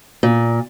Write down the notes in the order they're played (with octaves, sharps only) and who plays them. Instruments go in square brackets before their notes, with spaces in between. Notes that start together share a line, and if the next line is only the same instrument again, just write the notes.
[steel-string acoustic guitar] A#2